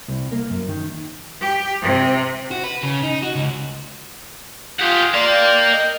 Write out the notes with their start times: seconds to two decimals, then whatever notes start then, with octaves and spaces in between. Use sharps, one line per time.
0.08 C2
0.32 A#3
0.50 F#2
0.68 D#3
1.41 G4
1.82 C3
2.51 F#4
2.64 B4
2.83 C#3
3.03 D#4
3.22 F#4
3.35 C#2
4.80 F4 G4 G#4 F#5
5.14 A#4 D5 F5 C6
5.27 G5
5.73 D#5